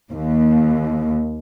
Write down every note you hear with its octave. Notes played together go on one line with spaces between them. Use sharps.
D#2